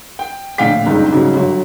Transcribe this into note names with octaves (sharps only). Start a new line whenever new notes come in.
G5
A#1 A2 D3 F5 G5 B6
F#1 C#2 G2 D#3
G#2 C#3 F#3 G3
G1 F#3